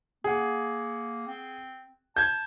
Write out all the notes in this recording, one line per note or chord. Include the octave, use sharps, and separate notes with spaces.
A#3 G#4 F#5
C4
A5 G6 G#6